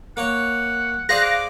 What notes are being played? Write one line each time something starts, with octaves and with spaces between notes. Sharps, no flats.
A#3 C#5 F#5
G#4 C5 D5 F5 F#6 A#6
D6